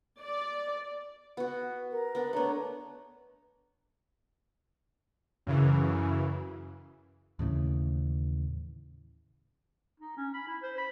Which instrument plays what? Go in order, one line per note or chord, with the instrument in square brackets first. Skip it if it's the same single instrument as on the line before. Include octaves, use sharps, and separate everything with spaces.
[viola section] D5
[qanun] B3 F#4
[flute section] A#4
[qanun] B3 D4
[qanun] A3 B3 [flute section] D4 C#5 A#5
[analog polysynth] F#2 C#3 E3
[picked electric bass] D#2 A2 C#3 E3
[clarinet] D#4
C#4
B5
E4
C5
B5